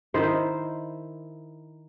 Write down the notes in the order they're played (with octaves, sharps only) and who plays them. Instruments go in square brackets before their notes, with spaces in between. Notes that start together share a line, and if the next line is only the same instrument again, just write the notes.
[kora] D#3 E4 C5